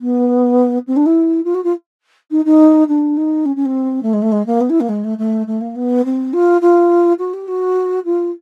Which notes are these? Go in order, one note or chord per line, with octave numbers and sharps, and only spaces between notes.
B3
C4
D4
E4
F4
F#4
F4
D#4
D#4
D4
D#4
C#4
C#4
C4
A3
G#3
A3
G#3
A#3
B3
E4
A#3
G#3
A3
A3
A3
A#3
B3
C4
F4
F4
F#4
G4
F#4
F4